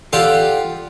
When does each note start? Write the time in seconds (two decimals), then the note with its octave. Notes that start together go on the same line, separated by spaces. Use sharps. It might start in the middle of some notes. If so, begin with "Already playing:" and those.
0.13 F4 G4 A4 D5 F5 F#5